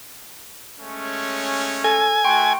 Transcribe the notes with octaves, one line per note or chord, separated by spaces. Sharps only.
G#3 A3 C#4
A4 G#5
A3 F#4 G5 C6 C#6